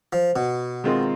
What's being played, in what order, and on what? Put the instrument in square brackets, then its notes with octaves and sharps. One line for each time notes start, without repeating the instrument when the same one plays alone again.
[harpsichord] F3
B2
[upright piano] D#3 G#3 C4 F4 A#4